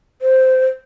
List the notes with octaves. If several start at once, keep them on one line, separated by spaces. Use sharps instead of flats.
C5